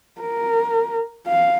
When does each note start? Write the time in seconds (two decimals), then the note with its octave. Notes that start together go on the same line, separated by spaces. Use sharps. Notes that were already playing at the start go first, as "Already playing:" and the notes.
0.21 A#4
1.28 F5